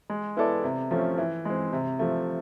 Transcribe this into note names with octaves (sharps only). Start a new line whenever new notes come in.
G#3
B3 E4 A4 D5
C3
F3 A3 C#4
E3
G#3 C4
C3
F3 A3